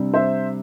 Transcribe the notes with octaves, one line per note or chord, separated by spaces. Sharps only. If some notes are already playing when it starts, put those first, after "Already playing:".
Already playing: C3 G3 D4
C5 E5